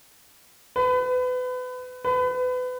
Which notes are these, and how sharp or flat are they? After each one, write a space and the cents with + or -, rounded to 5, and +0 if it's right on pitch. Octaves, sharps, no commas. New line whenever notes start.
B4 +30
B4 +30